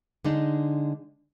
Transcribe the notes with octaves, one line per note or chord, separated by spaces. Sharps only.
D3 G#3 D4 D#4